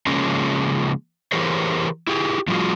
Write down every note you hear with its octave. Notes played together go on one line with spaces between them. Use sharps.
C#3 F3 G#3 A#3 C#4
E3 G4 G#4 A#4 C5 C#5
E4 G4 G#4
A2 F3 G3 F4 F#4 G#4